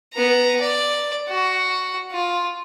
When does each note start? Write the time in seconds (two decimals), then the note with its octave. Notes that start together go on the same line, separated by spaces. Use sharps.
0.13 B3 A#5
0.61 D5
1.29 F#4
2.11 F4